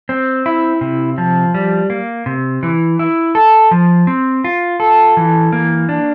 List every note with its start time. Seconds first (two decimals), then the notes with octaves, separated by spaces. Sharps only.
0.09 C4
0.46 E4
0.81 C3
1.18 F3
1.54 G3
1.90 A#3
2.26 C3
2.63 E3
2.99 E4
3.35 A4
3.71 F3
4.07 C4
4.44 F4
4.80 A4
5.17 E3
5.52 A#3
5.89 D4